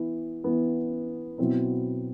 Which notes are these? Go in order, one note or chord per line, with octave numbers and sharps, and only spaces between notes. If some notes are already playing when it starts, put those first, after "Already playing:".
Already playing: E3 B3 E4
E3 B3 E4
B2 F#3 C4 E4